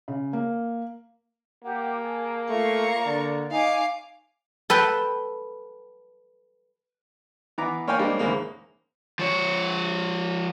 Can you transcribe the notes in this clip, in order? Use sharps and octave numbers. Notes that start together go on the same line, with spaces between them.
C#3
A#3
A#3 G4 F#5
G#4 A5
A3 F4 C#5 F5 A#5 C#6
D3 D5
D#4 C#5 F5 G#5 D6
A4 B4 G5 A5
E3 B3 A#5 D6
A#3 C#5 F5 G5 G#5
G3 G#3 A#3 C4 D4 G4
E2 G#2 C#3 A#3 C4
F3 C#5